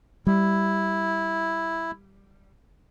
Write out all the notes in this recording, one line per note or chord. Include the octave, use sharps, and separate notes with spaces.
G3 E4